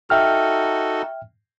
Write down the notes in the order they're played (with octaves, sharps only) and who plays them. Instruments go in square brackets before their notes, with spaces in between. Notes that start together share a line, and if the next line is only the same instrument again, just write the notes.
[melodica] D#4 F#4 A4 [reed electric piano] E5 G5 F6